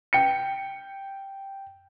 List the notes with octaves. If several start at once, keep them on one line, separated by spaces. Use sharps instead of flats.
G5 C#7